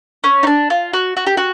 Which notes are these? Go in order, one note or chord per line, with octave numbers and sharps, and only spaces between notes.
C#4
D#4
D4
F4
F#4
F#4
G4
F#4